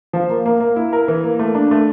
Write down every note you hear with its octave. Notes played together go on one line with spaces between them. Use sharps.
F3
A#3
A#3
A#3
E4
A#4
E3
A#3
A3
D4
A3